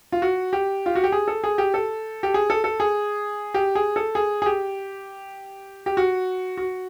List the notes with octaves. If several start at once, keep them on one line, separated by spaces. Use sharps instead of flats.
F4
F#4
G4
F4
F#4
G4
G#4
A4
G#4
G4
A4
G4
G#4
A4
A4
G#4
G4
G#4
A4
G#4
G#4
G4
G4
F#4
F#4